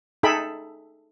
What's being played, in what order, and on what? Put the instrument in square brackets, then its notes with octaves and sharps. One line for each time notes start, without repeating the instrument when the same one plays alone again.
[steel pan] D#4 G#4 A4 E5 G5 B5